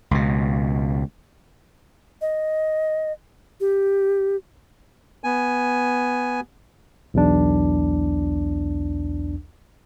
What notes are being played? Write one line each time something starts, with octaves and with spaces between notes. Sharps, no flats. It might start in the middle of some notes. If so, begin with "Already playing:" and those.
C#2 B2
D#5
G4
B3 G#5
B1 E2 D4